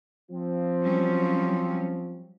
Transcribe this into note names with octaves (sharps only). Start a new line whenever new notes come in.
F3 C4
F#3 G3 C#4